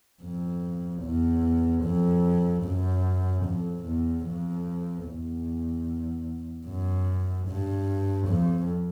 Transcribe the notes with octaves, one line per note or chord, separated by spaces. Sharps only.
F2
E2
F2
F#2
F2
E2
F2
E2
F#2
G2
F2